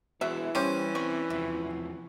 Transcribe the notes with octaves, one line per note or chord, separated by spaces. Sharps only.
E3 F#3 B3 F#4 G#4 E5
G3 C#4 G4 C5 C#5
C4 D5 C#6
E2 C3 F3 E5